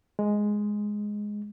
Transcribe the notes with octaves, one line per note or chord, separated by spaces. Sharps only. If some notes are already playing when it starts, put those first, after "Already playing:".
G#3